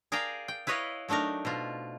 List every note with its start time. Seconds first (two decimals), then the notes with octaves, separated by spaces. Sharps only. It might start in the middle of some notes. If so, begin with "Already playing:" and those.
0.12 G#4 A#4 D5 F5 G5 A#5
0.48 G5
0.67 E4 B4 C#5 D#5 F5
1.08 F#3 A3 D4 D#4 A#4
1.45 B2 C4 F4